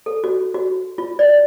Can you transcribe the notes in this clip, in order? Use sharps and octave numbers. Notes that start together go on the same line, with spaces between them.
A4
F#4
F#4
F4
D5